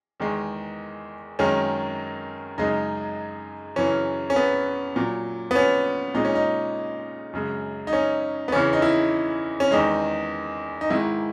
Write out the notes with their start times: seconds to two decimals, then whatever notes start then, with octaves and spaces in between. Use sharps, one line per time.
0.20 E2 D#3 G#3
1.39 F#2 D#3 G#3 C#4
2.58 F#2 C#3 G#3 D#4
3.76 F#2 C#3 E3 C#4
4.30 C#4
4.36 B3
4.96 A#2 F#3
5.51 B3
5.55 C#4
6.14 A#2 G#3 D#4
6.25 C#4
6.35 D#4
7.33 F#2 C#3 G#3
7.87 D#4
7.93 C#4
8.48 B3
8.52 E2 C#3 E3 C#4
8.73 D#4
8.82 E4
9.60 C#4
9.71 E2 D#3 G#3 D#4
10.81 D#4
10.90 G#2 D#3 G#3 E4